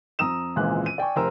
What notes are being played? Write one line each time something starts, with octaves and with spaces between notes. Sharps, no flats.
F2 A#5 D#6 E6 E7
G#1 C#2 A#2 E3 G#3 F#6
D#7
D5 G5 G#5 C#6
F1 A#4 C5 A#5 E6